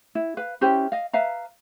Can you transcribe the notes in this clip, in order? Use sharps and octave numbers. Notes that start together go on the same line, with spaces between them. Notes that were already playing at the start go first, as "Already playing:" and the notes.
E4
B4 F5
C#4 E4 G4 C5
D#5 F5
B4 E5 F5 A#5